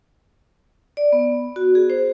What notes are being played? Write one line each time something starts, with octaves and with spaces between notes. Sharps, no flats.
D5
B3
F#4
G#4
C5